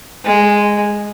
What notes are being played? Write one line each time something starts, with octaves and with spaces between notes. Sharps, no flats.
G#3